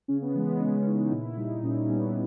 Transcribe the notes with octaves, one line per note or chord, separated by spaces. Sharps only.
C#3 C#4
B3
E3 G#3 B3
B3
C#3 C#4
E3 G#3 D#4
A#2 E4
G3 D#4
A#2 C#4
G3 B3